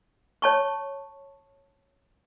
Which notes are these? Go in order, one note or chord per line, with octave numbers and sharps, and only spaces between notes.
C#5 A5 C#6